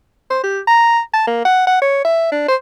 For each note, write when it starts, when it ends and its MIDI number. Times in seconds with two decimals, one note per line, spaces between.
0.30 0.42 72
0.43 0.60 67
0.67 1.00 82
1.14 1.25 81
1.27 1.44 58
1.45 1.65 78
1.67 1.78 78
1.82 2.01 73
2.05 2.28 76
2.32 2.47 62
2.49 2.56 72